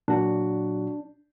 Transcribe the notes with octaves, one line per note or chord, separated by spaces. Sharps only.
A#2 F#3 D4 F#4